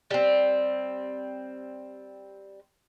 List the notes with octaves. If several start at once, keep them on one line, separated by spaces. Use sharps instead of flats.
G3 C4